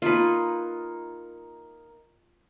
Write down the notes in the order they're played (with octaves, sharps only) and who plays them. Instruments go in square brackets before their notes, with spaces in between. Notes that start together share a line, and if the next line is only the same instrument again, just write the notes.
[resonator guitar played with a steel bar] A#3 D#4 [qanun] F4 B4